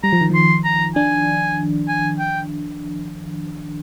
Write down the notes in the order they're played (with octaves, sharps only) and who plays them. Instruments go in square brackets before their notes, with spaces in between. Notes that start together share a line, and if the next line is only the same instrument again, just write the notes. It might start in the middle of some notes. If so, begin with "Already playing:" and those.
[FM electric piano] G3 [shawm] A#5
[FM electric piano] F3
D#3
[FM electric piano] F3 [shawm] C6
[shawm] A#5
[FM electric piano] D4 [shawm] G#5
[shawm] G#5
G5